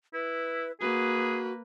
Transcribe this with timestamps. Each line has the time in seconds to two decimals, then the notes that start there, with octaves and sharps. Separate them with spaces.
0.13 E4 B4
0.81 A#3 F#4 G#4 B4